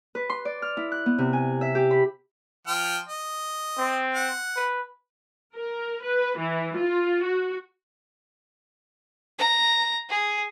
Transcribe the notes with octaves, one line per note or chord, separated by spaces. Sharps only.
B4
C6
D5
F6
E4
F#6
B3
C3
G#5
E5
G4
B5
F3 G5 F6
D#5
C4
F#5
B4
A#4
B4
E3
F4
F#4
A#5
G#4